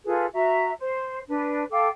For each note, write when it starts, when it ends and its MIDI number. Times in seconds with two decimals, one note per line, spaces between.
0.05 0.25 65
0.05 0.25 68
0.05 0.25 69
0.05 0.25 71
0.33 0.70 66
0.33 0.70 76
0.33 0.70 82
0.78 1.18 72
1.28 1.63 62
1.28 1.63 71
1.71 1.87 69
1.71 1.87 77
1.71 1.87 79
1.71 1.87 86